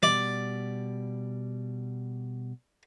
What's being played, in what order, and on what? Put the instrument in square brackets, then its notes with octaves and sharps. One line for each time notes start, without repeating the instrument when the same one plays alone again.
[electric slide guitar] B2 G3 [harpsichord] D5